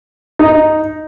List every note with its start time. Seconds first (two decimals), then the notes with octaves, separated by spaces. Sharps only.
0.39 D#4